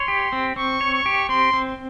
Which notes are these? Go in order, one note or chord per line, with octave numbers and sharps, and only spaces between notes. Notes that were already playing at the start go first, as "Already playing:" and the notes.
Already playing: C#5 C6
G4
C4
C4 C#6
C#5
C#6
G4
C4 C6
C4